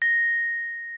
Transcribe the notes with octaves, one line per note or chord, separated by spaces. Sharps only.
A#6